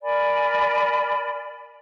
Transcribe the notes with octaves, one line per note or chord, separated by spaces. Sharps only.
A#4 D5 G#5 B5